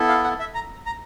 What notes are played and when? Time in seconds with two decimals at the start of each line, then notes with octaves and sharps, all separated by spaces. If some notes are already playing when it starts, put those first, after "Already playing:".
Already playing: B3 E4 A4
0.08 F5
0.24 F#5
0.40 E5
0.55 A#5
0.86 A#5